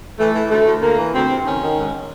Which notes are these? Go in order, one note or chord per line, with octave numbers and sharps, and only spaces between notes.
E3 A3
E3
D2 A3
D2
D2 A#3
E3
D2 C4
C3
D#3 C#4
D#3
G#2